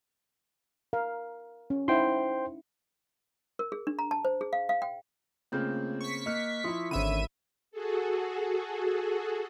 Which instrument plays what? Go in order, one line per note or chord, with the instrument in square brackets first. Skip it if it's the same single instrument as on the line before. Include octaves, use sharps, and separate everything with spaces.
[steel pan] A#4 F5
C#4
[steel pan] D#4 E4 F#5 [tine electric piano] C5 G5 C6
[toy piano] A#4
G#4
D4
A#5
A5
C5
G#4
F5
F5
G5
[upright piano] C#3 A#3 C4 [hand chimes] A3 F4 G6
[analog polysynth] C#6 B6
[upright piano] A#3 [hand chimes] D#5 F6 F#6
[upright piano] F3 E4 [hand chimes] E5 C6 D#6
[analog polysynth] G#1 E5 D#7 [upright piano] D3 C#4 [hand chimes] B5
[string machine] F#4 G#4 A4